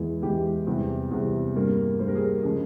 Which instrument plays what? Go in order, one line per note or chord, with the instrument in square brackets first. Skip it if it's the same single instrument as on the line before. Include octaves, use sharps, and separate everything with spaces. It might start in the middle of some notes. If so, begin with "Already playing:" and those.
Already playing: [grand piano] E2 E3 G#3 G#4
E2 E3 G#3 G4
E2 C3 E3 G3
E2 C3 E3 G3 G#4
G2 G3 A#3
G2 G3 A#3 C5
A#4
G#4
A#4
C#3 F3 G#3 G#4